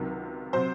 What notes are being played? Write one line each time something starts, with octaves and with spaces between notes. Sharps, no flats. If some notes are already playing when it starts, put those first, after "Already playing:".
Already playing: C#2 C3 D#3 F#3
C3 F#3 C5